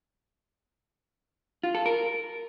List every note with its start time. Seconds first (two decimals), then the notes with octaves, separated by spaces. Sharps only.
1.63 F4
1.75 A4
1.86 A#4